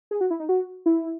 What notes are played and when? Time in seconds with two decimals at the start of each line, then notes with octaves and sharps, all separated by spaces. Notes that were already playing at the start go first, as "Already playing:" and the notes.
0.11 G#4
0.21 F#4
0.30 E4
0.40 D#4
0.49 F#4
0.86 E4